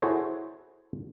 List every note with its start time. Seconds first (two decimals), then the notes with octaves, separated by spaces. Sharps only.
0.02 E4 F#4 G#4 A4 C5 C#5